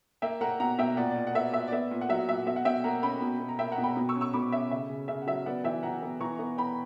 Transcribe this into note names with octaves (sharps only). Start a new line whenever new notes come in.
A#3 E5 G5
A#3 F#5 A#5
B2 F#5 A#5
B2 E5 G5
A#2 D5 F#5
D5
A#2
F#5
B3 E5
A#2 E5
D5
B3 E5
A#2
F#5
F#3 E5
A#2 E5
B2 E5
F#5
B2 E5 G5
A#3 F#5 A#5
C#4 G5 B5
B2
B2
A#5
A#3 E5 G5
F#5 A#5
B2
G5 B5
B2
C#6 E6
C#4
C#6 E6
B2 B5 D6
C#4 E5
C#3 E5
C#3
C#3 E5
F#5
F#3 E5
B3 D5 F#5
E3 E5 G5
E3 F#5 A#5
B3
E3 A#5 C#6
B3
B3 G5 B5